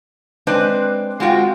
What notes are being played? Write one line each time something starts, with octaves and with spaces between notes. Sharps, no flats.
G#3 C4 D4 B4 C5
G#3 C4 F4 F#4 G5